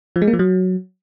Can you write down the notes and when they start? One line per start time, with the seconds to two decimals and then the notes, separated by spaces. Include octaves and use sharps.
0.16 F3
0.22 G#3
0.27 A#3
0.33 F3
0.39 F#3